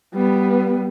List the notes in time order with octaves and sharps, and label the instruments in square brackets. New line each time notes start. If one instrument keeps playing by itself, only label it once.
[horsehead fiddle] G3 B3